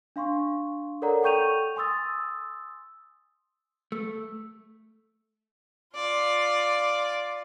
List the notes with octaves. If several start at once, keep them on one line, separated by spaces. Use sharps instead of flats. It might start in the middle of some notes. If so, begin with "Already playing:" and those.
D4 F5 C6 C#6
A4 A#4 C#5 D5 F#5 A#5
A4 G5 C#6 G6 D#7 F7
G#5 C6 D#6 E6 A6
A3
F4 D5